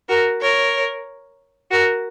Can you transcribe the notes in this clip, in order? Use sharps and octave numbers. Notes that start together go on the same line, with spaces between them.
F#4 A#4
A#4 C#5
F#4 A#4